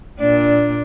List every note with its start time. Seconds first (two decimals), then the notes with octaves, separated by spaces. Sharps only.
0.19 A#2 D4